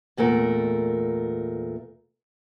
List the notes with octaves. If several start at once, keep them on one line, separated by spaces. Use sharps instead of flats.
E2 A#2 A3 A#4